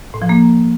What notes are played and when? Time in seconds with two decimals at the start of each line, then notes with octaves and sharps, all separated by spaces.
0.14 A2
0.22 F3
0.29 A#3